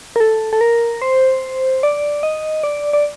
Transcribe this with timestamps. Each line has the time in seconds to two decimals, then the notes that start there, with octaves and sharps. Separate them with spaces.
0.16 A#4
0.20 A4
0.53 A4
0.61 A#4
1.02 C5
1.83 D5
2.23 D#5
2.64 D5
2.93 D5